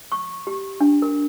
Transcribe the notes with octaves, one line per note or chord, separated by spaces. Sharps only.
C#6
G4
D4
A#4